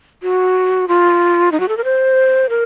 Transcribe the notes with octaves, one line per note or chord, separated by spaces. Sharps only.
F#4
F4
D#4
F#4
A4
A#4
C5
A#4